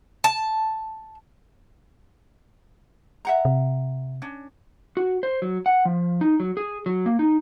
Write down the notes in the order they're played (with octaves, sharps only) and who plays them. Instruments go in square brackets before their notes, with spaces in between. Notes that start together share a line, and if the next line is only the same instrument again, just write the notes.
[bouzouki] A5
[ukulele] E5 F#5 A#5
[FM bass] C3
[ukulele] C#4 D4
[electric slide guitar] F#4
C5
F#3
F#5
F3
D#4
F#3
G#4
F#3
A#3
D#4